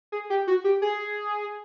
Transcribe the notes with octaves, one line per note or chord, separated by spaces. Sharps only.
G#4
G4
F#4
G4
G#4